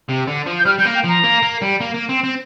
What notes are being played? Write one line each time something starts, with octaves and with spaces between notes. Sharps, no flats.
C3
D3
F3
G6
G3 F6
G3 G6
A#3
G5
F3 A#5
A#3
A#3
G3
A#3
A#3
C4
C4